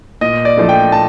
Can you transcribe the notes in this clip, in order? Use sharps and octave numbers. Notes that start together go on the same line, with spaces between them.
A#2 D#5
D5
F3 A3 D4
G5
A#2 A5